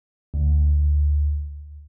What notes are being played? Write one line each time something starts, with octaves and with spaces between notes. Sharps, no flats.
D2